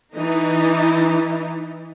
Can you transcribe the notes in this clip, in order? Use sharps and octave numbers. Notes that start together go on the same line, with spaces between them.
E3 D#4